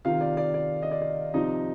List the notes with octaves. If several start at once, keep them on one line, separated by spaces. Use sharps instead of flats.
C3 D#3 F4 F5
D5
D5
D5
D#5
D5
D5
C3 F3 D#4 D#5